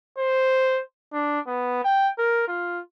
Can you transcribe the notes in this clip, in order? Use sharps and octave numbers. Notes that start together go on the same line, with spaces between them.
C5
D4
B3
G5
A#4
F4